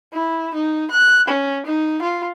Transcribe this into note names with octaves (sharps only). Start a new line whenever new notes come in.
E4
D#4
F#6
C#4
D#4
F4